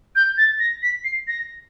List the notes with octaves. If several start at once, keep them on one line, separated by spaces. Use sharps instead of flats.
G6
A6
A#6
B6
C7
A#6